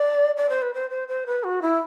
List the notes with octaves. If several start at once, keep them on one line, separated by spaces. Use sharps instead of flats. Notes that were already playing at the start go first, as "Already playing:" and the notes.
Already playing: D5
D5
C5
B4
C5
C5
C5
B4
F#4
E4